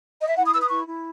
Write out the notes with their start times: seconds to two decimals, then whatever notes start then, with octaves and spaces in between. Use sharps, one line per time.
0.21 D#5
0.29 E5
0.37 E4 F#5
0.45 D#6
0.53 B4 E6
0.62 D#6
0.70 E4 C#6
0.87 E4